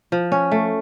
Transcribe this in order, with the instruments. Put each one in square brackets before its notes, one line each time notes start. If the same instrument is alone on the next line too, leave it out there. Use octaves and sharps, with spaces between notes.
[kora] F3
C#4
A3